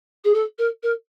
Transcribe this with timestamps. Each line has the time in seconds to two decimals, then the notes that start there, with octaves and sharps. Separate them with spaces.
0.24 G#4
0.34 A4
0.58 A#4
0.83 A#4